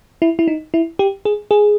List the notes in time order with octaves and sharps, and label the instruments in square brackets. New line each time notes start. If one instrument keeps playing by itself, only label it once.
[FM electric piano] E4
E4
D#4
E4
G4
G#4
G#4